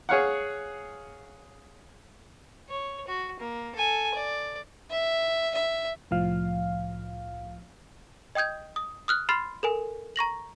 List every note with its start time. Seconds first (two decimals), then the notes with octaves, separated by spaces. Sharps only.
0.09 G#4 C#5 F5 F#5
2.69 C#5
3.07 F#4
3.40 A#3
3.75 A4 G#5
4.14 D5
4.91 E5
5.55 E5
6.11 C2 A2 F3 F5
8.35 D#5 G5 D#6 G6 G#6
8.76 D#6
9.08 D#6 F6 F#6
9.29 B5 C6 F6 A6 C7 E7
9.63 A4 A#4 G#5
10.16 A#5 C#6 A#6 F#7